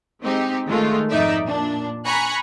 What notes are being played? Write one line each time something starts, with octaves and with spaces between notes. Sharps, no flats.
G#3 C4 D#4 G4
D#3 G#3 A3 F4
F2 G#2 D#4 D5 E5
A#2 D4
G#5 A#5 B5 C#6 F#6